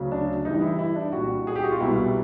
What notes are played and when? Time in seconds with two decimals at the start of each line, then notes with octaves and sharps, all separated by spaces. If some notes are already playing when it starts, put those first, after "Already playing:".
Already playing: D2 C#3 F#3
0.12 D4
0.45 G2 E3 G3 D#4
0.62 E4
0.79 E4
0.96 D4
1.12 C2 A#2 G3 F#4
1.47 G#4
1.56 G4
1.64 F#4
1.72 F4
1.80 C2 B2 G3 E4